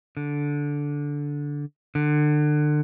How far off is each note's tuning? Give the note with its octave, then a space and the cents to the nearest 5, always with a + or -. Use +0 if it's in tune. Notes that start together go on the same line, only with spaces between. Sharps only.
D3 -10
D3 +30